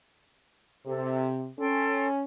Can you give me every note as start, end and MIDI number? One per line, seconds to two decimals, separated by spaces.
0.86 1.48 48
0.86 1.30 69
1.59 2.23 61
1.59 2.07 69
1.59 2.07 79
1.59 2.07 84